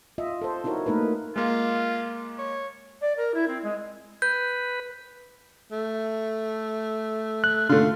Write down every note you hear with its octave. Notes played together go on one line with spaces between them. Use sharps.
F4 D#5 E5
A4 C5
D#4 E4 F#4 A#4 C#5
A3 A#3 D#4 A#4 B4
G#3 A#3 F4
C#5
D5
A#4
E4
C4
G#3
B4 G6
A3
F#6
D3 A3 F4